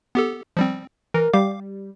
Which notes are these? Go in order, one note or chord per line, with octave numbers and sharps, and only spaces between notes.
B3 G4 A4
F3 G3 C4
E3 A#4
G3 F5 D6